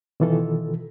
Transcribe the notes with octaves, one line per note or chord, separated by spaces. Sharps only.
B2 D#3 E3 F4 A4